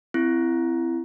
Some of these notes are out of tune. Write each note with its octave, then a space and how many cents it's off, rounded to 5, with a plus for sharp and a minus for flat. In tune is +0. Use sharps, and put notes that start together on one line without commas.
C4 -20 E4 +20